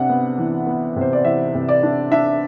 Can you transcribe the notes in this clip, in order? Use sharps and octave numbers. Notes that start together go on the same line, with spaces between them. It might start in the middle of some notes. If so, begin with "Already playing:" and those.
Already playing: C3 D4 F#5
B3
E3
B3
C3 C5
D5
E3 E5
C3
D5
D4
D4 E5